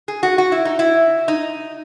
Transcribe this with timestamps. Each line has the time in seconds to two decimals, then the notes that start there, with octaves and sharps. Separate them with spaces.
0.08 G#4
0.23 F#4
0.38 F#4
0.52 E4
0.65 D#4
0.79 E4
1.28 D#4